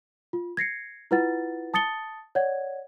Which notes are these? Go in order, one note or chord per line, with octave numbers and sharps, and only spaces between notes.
F4
G#6 A#6 C7 C#7
E4 F4 B4 F#5 A6
A5 D#6 A6 C#7 G7
C#5 D5 F#5 G#6